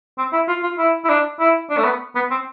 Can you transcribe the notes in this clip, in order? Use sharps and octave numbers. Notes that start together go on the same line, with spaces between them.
C4
E4
F4
F4
E4
E4
D4
E4
D4
A3
B3
B3
C4